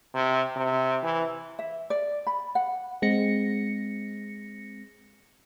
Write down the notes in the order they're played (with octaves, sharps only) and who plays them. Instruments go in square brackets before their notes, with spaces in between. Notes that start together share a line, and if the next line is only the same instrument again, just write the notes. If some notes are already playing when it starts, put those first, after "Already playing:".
[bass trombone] C3
C3
E3
[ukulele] E5
D5
B5
F#5
[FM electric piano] G#3 C4 A#6 C#7